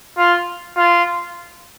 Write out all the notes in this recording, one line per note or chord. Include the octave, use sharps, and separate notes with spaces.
F4
F4